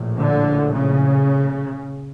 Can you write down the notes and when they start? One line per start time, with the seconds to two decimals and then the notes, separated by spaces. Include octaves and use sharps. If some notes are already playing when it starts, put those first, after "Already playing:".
Already playing: A#1 A2
0.18 D3
0.74 C#3